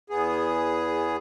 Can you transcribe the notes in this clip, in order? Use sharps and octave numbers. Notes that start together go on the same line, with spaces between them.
E2 B3 G#4